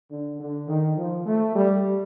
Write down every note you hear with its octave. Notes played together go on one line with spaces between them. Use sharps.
D3
D3
D#3
F3
A3
G3